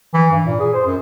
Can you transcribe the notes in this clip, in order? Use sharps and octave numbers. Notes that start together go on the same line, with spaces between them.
E3
G2
A#2
G#4
C5
F#2